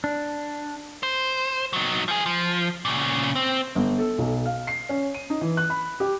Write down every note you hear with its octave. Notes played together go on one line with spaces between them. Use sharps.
D4
C5
F#3 D#4
F3 G#4
F3
A#2 C#3
C4
G1
A4
B1
F5
C7
C#4
D#7
D#4
E3
F#6
B5
G4